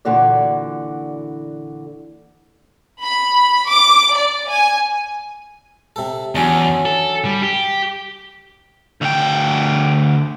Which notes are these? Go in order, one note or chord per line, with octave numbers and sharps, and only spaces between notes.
A#2 D3 E3 F#4 D5
B5
D6
D5
G#5
C3 A4
E2 F#3 C#4 D4
A4
G3
G4
D2 G5